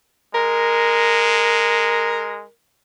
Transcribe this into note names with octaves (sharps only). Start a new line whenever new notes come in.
G#3 A#4